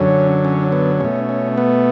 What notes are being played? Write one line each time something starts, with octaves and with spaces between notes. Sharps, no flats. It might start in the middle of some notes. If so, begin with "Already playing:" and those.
Already playing: F#2 D3 F#3 C#4
C#4
B3
B2 A3 C#4
C#4
B3